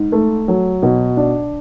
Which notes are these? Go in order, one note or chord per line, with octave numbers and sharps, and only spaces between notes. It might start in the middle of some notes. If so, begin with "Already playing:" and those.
Already playing: G#2
A3
F#3
B2
D4